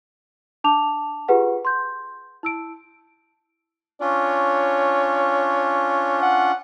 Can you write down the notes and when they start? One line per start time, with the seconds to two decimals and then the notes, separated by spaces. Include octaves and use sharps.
0.64 D4 A5 D6 F7
1.28 F4 G4 G#4 B4 F#5
1.65 C6 G6
2.43 E4 E6 D7
4.01 C#4 D4 F4 C#5
6.22 F#5